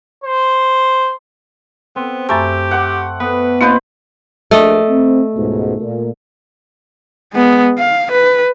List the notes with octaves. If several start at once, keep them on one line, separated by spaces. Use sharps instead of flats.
C5
B3 C4
F#2 A3 G4 G#5 C6
F#5 D6
B3 B4
A#3 C4 D#4 F4 B4 C5 D#5
A#1 A3 D#5
C4
C#2 G#2 B2
A#2
G#3 B3
F5
B4